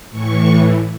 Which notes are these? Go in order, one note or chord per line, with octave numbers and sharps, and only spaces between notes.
A2 E3 C#6